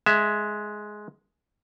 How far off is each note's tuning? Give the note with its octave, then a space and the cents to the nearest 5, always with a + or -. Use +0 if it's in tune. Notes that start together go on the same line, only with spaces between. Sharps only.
G#3 +10 E5 +0